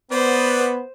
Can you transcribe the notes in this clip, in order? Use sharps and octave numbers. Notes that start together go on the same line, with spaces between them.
B3 B4 C5 D5